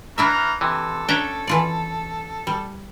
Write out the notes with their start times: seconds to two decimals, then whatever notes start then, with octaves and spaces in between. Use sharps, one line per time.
0.18 E3 D4 E4 E5 A#5 F6
0.61 C3 E3 A4
1.09 C#4 D4 E5 G5 A#5
1.47 E3 F4 D5
2.47 G3